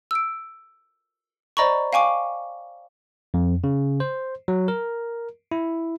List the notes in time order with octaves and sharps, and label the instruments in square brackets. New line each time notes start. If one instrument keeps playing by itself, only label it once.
[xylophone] E6 D7
C5 D5 D#5 A#5 B5 C#6
F5 G5 G#5 C#6 D6
[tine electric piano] F2
C#3
C5
F#3
A#4
E4